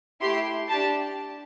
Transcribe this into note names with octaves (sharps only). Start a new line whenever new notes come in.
A3 E4 G4 C6
D4 G4 A5